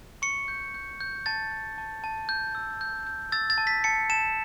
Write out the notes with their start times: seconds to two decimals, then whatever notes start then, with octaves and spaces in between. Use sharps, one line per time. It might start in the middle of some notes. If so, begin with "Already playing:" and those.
0.22 C#6 C#7
0.48 G6
0.74 G6
1.00 G6
1.26 A5 A6
1.52 G6
1.78 A5
2.04 A5
2.29 G6
2.55 E6
2.81 G6
3.07 G6
3.32 E6 A6
3.50 A6
3.58 A5
3.67 B6
3.84 A5 C#7
4.10 A5 E7